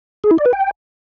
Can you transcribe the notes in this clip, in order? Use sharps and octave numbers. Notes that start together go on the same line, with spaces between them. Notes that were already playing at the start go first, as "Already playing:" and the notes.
G#4
E4
D5
B4
G5